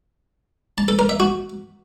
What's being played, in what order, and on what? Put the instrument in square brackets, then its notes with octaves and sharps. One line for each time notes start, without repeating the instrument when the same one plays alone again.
[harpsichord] A5
A4
A#4
E5
F#4